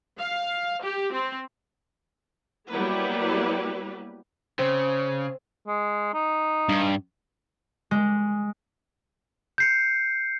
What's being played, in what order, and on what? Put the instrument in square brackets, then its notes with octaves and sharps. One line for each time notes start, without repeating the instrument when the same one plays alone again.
[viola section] F5
G4
C4
F#3 G3 A#3 B3 E4 B4
[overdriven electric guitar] C#3 [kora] C4
[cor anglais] G#3
D#4
[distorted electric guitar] G2
[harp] G#3
[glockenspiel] G6 C7 C#7